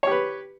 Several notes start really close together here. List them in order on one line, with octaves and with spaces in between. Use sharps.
C#5 G4 B4